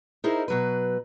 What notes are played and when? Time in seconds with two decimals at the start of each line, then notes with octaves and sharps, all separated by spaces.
0.24 D#4 E4 G#4 A#4 C5 D#5
0.48 B2 F#3 B4